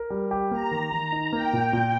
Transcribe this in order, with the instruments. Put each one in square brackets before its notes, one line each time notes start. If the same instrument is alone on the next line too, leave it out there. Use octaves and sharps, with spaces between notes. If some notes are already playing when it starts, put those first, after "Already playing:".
Already playing: [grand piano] A#4
G3
G4
[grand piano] A#3 [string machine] A#5
[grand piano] D#3
[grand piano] D#3 [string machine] A#5
[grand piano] D#4
[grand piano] A#3 [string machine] G5
[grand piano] A#2
A#2